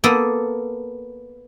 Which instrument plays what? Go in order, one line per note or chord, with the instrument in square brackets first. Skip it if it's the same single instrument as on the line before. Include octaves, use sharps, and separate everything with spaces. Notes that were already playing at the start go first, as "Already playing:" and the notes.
[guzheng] A#3 B3 A4